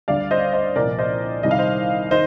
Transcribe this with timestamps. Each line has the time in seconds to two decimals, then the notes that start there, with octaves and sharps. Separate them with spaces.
0.08 D2 D3 G3 D5 F5
0.31 C5 D#5
0.53 C5 D#5
0.76 C2 A#2 F3 A#4 D5
0.99 C5 D#5
1.43 C2 C3 D#3 G3 D#5
1.51 F5
1.59 C5 D#5
2.11 D#3 C5 D#5